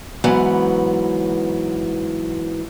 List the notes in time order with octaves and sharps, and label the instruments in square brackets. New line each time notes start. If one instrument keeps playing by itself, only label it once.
[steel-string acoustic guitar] G#2 E3 F#3 B3